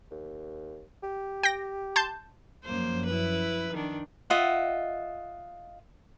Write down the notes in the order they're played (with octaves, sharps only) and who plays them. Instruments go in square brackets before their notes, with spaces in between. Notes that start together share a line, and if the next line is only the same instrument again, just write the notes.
[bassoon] D#2
G4
[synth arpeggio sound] G5 A#6
A5 C6 G6
[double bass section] F#2 F3 [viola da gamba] A#3 C5
[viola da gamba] E4 B4
D#3 D4
[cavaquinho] F4 D#5 E5 F#5